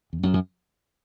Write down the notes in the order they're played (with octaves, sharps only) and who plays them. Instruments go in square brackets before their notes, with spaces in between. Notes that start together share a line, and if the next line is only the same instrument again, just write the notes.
[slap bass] E2
F#2
F#2